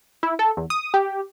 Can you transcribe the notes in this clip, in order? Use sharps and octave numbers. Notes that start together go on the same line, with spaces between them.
E4
A4
E2
D#6
G4